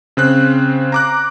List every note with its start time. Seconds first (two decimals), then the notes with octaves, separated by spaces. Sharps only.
0.17 C#3 C4 F#6
0.92 A#5 D6 F#6